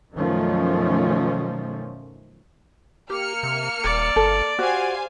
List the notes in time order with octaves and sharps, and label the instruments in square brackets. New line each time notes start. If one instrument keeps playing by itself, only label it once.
[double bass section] F#2 B2 D#3 F3 A3 C#4
[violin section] A#3 F6 C#7 [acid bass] G4
[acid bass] C3
[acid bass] D#1 [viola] D5
[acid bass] G1 [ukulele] A4
[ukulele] F#4 [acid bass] G4 [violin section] C5 F5 G#5